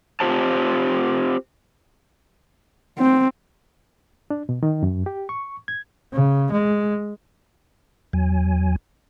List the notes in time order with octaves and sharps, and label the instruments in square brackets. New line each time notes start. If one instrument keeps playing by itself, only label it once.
[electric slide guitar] C4 F4 G4 C5 A5
[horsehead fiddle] C4
[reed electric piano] D4
B2
D#3
F#2
G4
C#6
G#6
[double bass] C#3
G#3
[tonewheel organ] E2 F#3 G#5